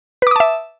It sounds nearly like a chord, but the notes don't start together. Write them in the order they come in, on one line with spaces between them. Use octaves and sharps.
B4 D6 D#6 A5 E5